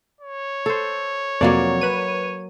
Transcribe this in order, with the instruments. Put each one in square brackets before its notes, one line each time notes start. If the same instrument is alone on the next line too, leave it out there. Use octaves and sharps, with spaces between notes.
[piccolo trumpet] C#5
[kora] A4 C5
[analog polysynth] F2 C3 [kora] F#3 A#3 D5
[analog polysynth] B4 D#7